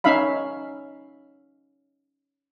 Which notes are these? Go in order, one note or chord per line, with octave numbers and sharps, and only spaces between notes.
C#4 D#4 E5 F5 B5